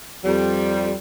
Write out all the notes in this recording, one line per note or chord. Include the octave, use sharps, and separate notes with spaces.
F2 G3